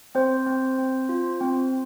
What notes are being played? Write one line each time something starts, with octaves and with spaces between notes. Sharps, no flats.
C4 C5
C4
C4
F4
C4